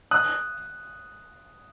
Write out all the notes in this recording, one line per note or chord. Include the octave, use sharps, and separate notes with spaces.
D#6 F#6